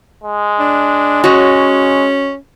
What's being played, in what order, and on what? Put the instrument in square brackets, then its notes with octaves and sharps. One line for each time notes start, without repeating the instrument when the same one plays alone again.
[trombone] G#3
[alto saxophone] D4
[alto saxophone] C#4 [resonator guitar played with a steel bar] F#4 C#5 D#5